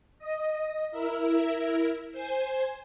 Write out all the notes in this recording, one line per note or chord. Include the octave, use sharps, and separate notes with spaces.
D#5
E4 A#4 E5
C5 G#5